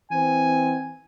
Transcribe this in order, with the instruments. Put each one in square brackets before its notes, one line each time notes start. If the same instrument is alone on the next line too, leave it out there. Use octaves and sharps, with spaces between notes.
[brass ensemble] E3 C4 [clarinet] G#5